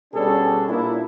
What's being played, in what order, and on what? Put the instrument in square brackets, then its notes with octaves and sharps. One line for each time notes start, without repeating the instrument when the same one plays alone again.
[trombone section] B2 G3 C#4 D4 G#4 A4
A#2 A#3 D4 E4